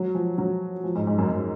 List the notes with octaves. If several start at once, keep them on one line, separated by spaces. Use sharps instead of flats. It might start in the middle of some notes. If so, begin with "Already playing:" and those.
Already playing: F#3
F3
F#3
F3
G#2
G#2
F#2
F#2